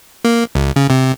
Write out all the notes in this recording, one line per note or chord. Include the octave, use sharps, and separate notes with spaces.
A#3
C#2
C#3
C3